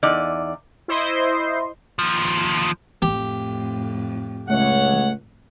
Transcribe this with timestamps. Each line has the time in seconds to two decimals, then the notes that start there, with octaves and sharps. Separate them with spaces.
0.03 E2 D#4 D5
0.88 E4 C5 D#5 C6
1.99 D#2 F3
3.02 F2 A2 G4
4.49 C#2 A3 C#5 F#5